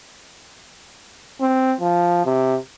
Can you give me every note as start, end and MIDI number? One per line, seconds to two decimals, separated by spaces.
1.41 1.73 60
1.81 2.23 53
2.25 2.56 48